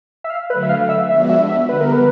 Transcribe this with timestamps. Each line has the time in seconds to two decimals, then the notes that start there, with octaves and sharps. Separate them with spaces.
0.24 E5
0.30 F5
0.49 D3 F#3 A3 B4
0.63 E5
0.69 F5
0.89 E5
1.09 F3 G#3 B3 D4 F#4 E5
1.30 E5
1.49 E5
1.69 D3 G3 B3 B4
1.80 A#4
1.92 B4